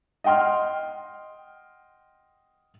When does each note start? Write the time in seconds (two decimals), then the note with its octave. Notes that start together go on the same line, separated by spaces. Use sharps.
0.24 D#5 F#5 G5 C6 F6